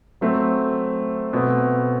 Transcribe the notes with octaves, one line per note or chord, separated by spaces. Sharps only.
F#3 A3 C4
B2 A3 C4